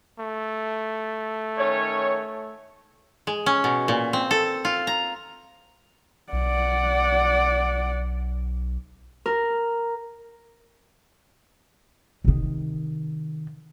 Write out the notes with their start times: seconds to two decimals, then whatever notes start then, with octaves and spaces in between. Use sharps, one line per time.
0.19 A3
1.58 D#3 C#4 C#5
3.27 G#3
3.46 C#4
3.64 B2
3.88 A#2
4.13 C4
4.31 A4
4.65 F4
4.87 A#5
6.32 B1 D5 F#5
9.26 A#4
12.25 C3 D#3